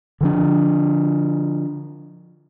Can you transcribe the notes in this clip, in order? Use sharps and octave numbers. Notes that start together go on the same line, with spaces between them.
D3 F3 D4